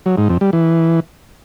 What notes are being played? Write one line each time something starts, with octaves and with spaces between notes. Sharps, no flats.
F#3
G#2
F2
G3
E3